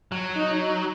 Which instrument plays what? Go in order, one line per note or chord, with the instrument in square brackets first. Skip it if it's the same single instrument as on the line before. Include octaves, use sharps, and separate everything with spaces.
[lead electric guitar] F#3
[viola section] D#4